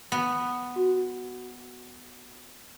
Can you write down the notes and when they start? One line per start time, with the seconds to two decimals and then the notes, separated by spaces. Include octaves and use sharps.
0.12 B3
0.76 F#4